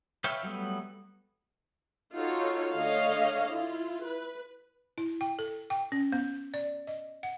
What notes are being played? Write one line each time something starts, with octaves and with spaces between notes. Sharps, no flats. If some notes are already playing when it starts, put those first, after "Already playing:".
B4 C#5 E5 F5 G5
F#3 G3 A3 B3
D#4 F4 F#4 A4 C#5
D3 A3 C#5 D#5 F5
E4 F4
B4
E4
G5
A4
G5
C#4
B3
D5
D#5
F#5